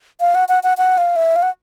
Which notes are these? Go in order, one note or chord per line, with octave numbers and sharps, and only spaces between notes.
F5
F#5
F#5
F#5
F#5
F5
E5
F5
F#5